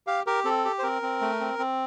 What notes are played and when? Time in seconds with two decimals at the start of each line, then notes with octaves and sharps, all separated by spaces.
0.07 G4 F5
0.27 G4 A#4
0.45 C4 A4
0.65 G4
0.79 C5
0.83 C4 A#4
1.02 C4
1.21 A3
1.40 C4
1.59 C4